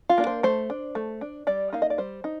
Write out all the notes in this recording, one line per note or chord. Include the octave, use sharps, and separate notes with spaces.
F4
A#3 D4
C5
A3 C5
D4
A3
D4
G3 D5
A#3 D#4 F5
D#5
D5
G3 C5
D#4